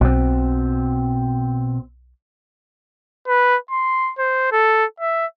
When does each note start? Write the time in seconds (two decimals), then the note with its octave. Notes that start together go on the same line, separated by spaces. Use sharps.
0.01 B1 B2 C4
3.28 B4
3.71 C6
4.18 C5
4.52 A4
5.00 E5